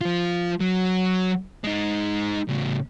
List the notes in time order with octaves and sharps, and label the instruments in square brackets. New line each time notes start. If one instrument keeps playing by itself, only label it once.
[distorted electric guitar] F3 F4
F#3
G#3 D#4
A2 C#3